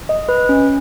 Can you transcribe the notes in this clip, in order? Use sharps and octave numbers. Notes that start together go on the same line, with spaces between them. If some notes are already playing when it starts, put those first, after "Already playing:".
D#5
B4
C#4